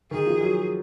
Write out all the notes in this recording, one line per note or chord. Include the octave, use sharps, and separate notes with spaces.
D#3 G#4
F3
F#3